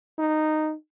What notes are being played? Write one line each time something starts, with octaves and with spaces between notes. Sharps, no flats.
D#4